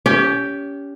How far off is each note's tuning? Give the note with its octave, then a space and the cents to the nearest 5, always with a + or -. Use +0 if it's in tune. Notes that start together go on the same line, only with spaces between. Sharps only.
C#4 +30 G4 +0